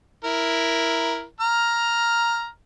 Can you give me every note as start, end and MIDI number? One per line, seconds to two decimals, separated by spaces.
0.24 1.23 64
0.24 1.23 70
1.40 2.47 82
1.40 2.47 89